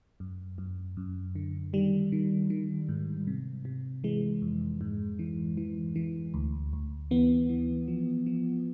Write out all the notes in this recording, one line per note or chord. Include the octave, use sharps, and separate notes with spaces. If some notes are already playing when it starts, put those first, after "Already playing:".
F#2
F#2
F#2
D3
D#3 G3
D#3
D#3
G#2
C3
C3
E3 G#3
F2
G#2
E3
E3
E3
D2
D2
E3 B3
E3
F3
F3